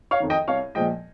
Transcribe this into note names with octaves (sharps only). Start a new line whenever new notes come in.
C#5 F5
F2 D#3
D#5 G5
C2 C#5 F5
A#2 F3 G#3 D#5 G5